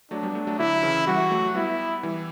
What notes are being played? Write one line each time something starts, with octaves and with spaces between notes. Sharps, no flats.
F#3 A3 D4
G3 B3
F#3 A3
F#3 A3
D3 F#3 E4
C#3 E3
E3 G3 F#4
F#3 A3
G3 B3 E4
E3 G3